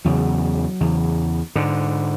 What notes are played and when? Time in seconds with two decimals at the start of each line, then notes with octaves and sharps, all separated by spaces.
0.05 E2 C#3 F#3
0.81 E2 C#3
1.55 G#2 D3